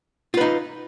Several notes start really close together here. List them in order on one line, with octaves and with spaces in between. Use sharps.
F4 B4 D#4